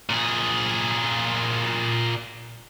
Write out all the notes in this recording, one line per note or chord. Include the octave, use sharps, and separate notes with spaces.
A#2 G#4